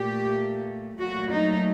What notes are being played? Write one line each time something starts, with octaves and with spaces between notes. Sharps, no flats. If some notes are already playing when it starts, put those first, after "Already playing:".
Already playing: A#2 A3 G4
A#2 F#3 A3 F#4
D#4